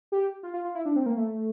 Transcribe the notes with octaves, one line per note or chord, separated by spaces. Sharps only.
G4
F4
F4
F4
E4
D4
C4
A#3
A3